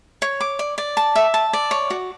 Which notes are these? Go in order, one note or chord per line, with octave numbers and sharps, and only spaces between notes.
C#5
D6
D5
D5
A5
E5
A5
D5
C#5
F#4